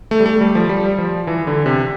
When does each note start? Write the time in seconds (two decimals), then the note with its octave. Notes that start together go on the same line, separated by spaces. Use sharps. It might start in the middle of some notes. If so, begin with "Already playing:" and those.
0.11 A3
0.20 G3
0.26 A3
0.41 G3
0.55 F3
0.69 G3
0.98 F3
1.27 E3
1.47 D3
1.66 C3